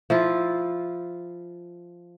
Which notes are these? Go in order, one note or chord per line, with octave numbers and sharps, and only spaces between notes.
F3 E4 F4